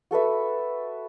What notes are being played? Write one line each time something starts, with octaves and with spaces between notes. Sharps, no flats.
F#4 A4 B4 E5